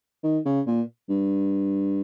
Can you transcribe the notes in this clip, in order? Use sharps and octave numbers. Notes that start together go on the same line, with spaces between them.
D#3
C#3
A#2
G2